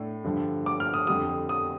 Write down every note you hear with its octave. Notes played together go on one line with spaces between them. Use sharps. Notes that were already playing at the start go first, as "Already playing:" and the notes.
Already playing: A2 A3 D4
G2 D3 F3
D6
F6
D#6
F2 D3 G3 D#6
D#6